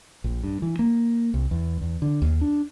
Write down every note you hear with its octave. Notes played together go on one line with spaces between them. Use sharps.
A#1
G2
E3
A#3
C2
E2
E2
D3
D#2
D4